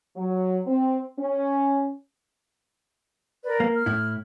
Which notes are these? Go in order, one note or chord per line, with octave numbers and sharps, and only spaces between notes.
F#3
C4
C#4
A#4 B4 D5
A#3 F5
F6
A2 E4